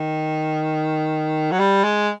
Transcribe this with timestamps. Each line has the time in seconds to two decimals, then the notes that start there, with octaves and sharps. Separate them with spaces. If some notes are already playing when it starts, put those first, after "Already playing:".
Already playing: D#3
1.52 F#3
1.60 G3
1.84 G#3